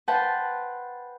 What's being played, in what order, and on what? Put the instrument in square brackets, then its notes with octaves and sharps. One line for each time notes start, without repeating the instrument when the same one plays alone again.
[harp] B4 F#5 G5 A5 C6